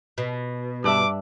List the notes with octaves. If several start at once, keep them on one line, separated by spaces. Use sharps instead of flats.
B2
G2 D4 E5 D6